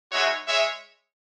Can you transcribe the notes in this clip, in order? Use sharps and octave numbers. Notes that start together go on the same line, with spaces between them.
G#3 D#4 F#4 C#5 E5
G#3 C#5 E5